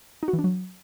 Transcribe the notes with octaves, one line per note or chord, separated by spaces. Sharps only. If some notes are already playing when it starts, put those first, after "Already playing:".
D#4
F#4
E3
D4
F#3